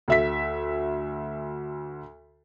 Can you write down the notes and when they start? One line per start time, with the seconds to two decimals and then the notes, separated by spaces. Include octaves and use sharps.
0.08 D2 E5 B6